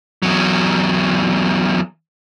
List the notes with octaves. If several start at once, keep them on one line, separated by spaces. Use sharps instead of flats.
E2 F#3